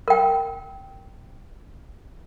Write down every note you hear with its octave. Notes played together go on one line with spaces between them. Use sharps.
A#4 G5